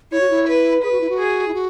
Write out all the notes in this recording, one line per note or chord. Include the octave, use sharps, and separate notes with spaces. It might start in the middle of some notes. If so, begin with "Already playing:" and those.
E4 C#5
F#4
E4
B4
G#4 B4
F#4
E4
F#4
G#4
E4
F#4